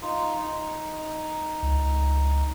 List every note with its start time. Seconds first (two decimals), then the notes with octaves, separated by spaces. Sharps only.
0.02 D#4 F4
0.40 D#4
1.62 C#2